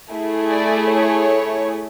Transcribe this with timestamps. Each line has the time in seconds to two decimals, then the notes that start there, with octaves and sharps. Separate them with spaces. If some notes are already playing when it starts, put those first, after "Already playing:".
0.12 A3 E4 G#4
0.51 D5
0.91 C#5